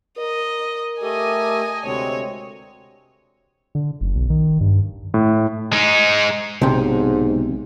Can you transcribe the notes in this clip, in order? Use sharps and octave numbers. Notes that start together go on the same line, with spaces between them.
A#4 D#5
A3 G4 A4 D#5 G#5
D2 C3 G#3 C4 C#5
D3
F#1
B1
D#3
G2
A2
G#3 D#4
B1 G#2 C3